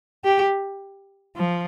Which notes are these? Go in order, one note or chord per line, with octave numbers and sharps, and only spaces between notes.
G4
F3